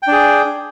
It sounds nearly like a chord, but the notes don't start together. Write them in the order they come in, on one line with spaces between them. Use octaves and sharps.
G5 D4 G#4